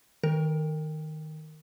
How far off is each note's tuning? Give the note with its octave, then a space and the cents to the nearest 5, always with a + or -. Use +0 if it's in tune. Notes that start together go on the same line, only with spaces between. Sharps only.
D#3 +0 A#4 -25